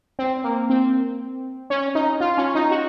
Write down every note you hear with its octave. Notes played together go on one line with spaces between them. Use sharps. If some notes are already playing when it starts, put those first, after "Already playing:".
C4
A#3
C4
C#4
D#4
F4
C#4
D#4
F#4